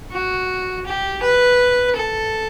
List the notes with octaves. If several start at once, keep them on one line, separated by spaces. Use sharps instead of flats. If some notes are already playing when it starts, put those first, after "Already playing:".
F#4
G4
B4
A4